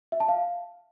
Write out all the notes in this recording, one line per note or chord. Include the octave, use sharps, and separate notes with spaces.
E5
A5
F5